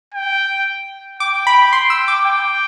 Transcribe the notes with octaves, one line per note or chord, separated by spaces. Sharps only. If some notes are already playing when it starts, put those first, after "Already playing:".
G5
G5 D6
B5
C6
E6
D6
G5